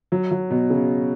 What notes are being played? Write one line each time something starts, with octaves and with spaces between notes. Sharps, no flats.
F#3
F#3
B2
C#3